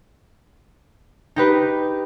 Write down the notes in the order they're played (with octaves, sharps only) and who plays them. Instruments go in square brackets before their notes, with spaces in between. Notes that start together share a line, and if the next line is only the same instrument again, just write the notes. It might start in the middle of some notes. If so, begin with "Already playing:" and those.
[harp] D#4 G4 B4